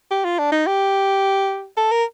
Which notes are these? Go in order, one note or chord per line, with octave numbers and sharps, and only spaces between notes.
G4
F4
D4
D#4
G4
A4
A#4